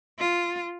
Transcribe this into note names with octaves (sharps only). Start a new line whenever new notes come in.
F4